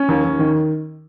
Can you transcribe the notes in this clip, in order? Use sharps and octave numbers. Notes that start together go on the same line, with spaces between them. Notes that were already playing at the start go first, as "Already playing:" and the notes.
Already playing: C#4
D#2
D#2
D#3